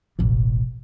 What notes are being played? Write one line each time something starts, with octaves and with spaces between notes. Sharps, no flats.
E1 A1